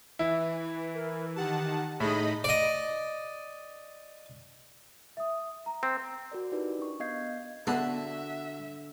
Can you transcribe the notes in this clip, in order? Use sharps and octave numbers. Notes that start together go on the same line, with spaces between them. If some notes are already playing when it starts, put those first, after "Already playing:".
E3 E4
A#4
D#3 G4 F#5 A5
A2 D#4 G#4 D#5 B5
D5 D#5
E5 D#6
A#5
C4
F#4 A#4 D5
D#4 E4 G4 A#4 B4 D5
D4 C#6
B3 D#5 F5 G6 G#6 C7
D3 B3 F#4 A4 E5 C7